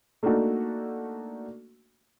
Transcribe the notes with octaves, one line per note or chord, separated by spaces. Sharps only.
A3 A#3 D4 D#4 F#4 A4